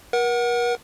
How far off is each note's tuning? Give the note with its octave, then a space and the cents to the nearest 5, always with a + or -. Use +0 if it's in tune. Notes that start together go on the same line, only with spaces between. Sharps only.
A#4 +40 F#5 +0